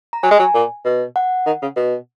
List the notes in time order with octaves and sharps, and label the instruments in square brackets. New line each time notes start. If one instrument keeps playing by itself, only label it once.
[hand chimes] A#5
[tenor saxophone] F#3 [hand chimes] G#5
[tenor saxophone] G#3
F#3
A#2
B2
[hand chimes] F#5
[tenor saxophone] D#3
C#3
B2